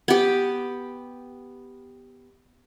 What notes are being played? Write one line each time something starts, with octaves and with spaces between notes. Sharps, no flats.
B3 G4